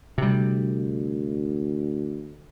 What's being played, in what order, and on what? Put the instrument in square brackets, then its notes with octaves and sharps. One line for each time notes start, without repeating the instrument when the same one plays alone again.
[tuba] D2 [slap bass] C3 G3